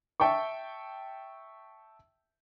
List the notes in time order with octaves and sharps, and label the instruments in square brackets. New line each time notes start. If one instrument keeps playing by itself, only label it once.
[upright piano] E5 G5 A5 C#6